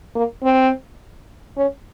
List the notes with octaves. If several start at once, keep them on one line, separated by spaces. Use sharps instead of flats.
A#3
C4
C#4